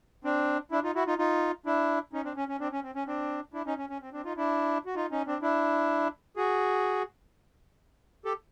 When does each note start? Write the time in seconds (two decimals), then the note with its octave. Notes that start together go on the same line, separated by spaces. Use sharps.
0.24 C4 D4
0.71 D4 E4
0.83 D#4 F4
0.95 E4 F#4
1.07 D#4 F4
1.18 D#4 F4
1.66 D4 E4
2.13 C#4 D#4
2.24 C4 D4
2.36 C#4
2.48 C#4
2.60 C4 D4
2.72 C#4
2.83 C4
2.95 C#4
3.07 C4 D4
3.54 D4 E4
3.66 C#4 D#4
3.78 C#4
3.90 C#4
4.01 C4
4.13 C4 D4
4.25 D#4 F4
4.37 D4 E4
4.86 F#4
4.95 D#4 F4
5.11 C#4 D#4
5.27 C4 D4
5.42 D4 E4
6.36 F#4 G#4
8.25 G4 A4